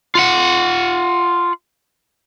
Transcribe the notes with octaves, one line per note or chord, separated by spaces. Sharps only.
F4 F#5